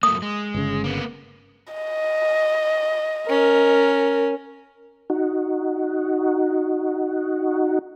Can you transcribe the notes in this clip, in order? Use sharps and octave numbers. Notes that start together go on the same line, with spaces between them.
F#2 A3 A#3 D#6
G#3
G1 C#3
A#3 B3
D#5
C#4 A#4
D#4 F#4